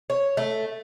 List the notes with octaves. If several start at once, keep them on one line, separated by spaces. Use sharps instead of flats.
C#5
A3